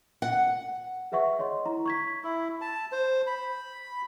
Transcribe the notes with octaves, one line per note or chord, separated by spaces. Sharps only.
F#5
G#4 B4 E5 F#5 C#6
C#5 D#5 C6
E4 A#5
C#6 G#6 B6
E4
A5
C5
B5